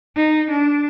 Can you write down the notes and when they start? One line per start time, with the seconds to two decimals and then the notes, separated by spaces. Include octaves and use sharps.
0.16 D#4
0.51 D4